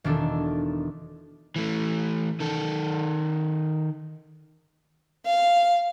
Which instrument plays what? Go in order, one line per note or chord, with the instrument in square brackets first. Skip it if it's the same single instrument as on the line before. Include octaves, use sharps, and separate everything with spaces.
[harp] E1 D#3 D4 A4
[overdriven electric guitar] E3 A3
D#3 A4
[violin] F5